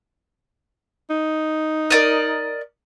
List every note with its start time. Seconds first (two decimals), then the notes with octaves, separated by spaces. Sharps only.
1.10 D#4
1.90 A#4 D5 D#5